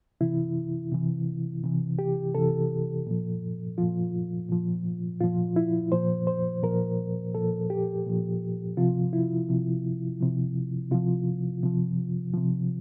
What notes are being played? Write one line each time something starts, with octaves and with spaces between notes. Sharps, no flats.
C3 E3 E4
C3 E3
C3 E3
G4
C3 E3 A4
A#2 F3
A#2 F3 F4
A#2 F3
A#2 F3 F4
E4
A#2 F3 C5
C5
A#2 F3 A#4
A#2 F3 A4
G4
A#2 F3
C3 F3 F4
E4
C3 F3
C3 F3
C3 F3 F4
C3 F3
C3 F3